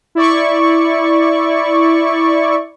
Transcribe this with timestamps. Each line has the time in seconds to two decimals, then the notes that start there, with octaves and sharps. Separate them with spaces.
0.15 E4 D5 C#6